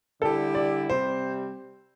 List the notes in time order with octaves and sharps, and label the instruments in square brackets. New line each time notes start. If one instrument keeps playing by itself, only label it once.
[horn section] D3 G3 E4 G4 [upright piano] A4
[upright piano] D5
[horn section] C3 G3 C4 [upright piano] C5